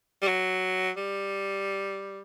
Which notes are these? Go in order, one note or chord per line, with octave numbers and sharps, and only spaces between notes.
G3
F#3
G3